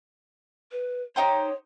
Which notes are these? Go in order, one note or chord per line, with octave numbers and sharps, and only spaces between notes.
B4
D#4 G4 C5 C#5